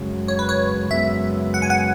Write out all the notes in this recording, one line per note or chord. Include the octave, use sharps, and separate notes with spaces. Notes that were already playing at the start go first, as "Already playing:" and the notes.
Already playing: F#2 C#3 G#3
C#5
B4
C#5
F#2 C#3 G#3 B3 E5
F#5
G#5
F#5